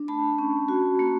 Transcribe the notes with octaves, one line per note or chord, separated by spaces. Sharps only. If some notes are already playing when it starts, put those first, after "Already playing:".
Already playing: D4
A3 A5 B5
C#4
F#4
A#3